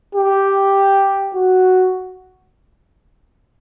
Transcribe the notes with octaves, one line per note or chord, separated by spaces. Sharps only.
G4
F#4